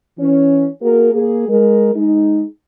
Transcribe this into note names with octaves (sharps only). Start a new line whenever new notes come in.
E3 C#4
A#3 F#4 G#4 A#4
A#3 G#4
G#3 A#4
G#3 D#4